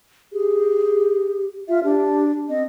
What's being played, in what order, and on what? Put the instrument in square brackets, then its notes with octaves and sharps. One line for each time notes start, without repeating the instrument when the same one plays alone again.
[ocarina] G4 [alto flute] G#4
[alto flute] F4 [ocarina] E5
[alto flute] D4 [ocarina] G4
[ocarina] C4 [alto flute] D#5